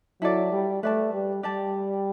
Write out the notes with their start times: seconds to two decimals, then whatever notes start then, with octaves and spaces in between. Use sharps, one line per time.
0.22 F#3 E4 A4 D5
0.52 G3
0.83 A3 B4 D5 A5
1.13 G3
1.43 G3 G4 D5 A5